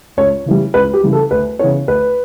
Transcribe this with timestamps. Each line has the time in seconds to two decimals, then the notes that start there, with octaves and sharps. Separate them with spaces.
0.17 C#2 C#5
0.46 C#3 E3 G3
0.74 C#2 B4
0.93 G4
1.03 C#3 E3 G3
1.13 A4
1.31 D2 B4
1.59 C#3 E3 B3 C#5
1.88 D2 B4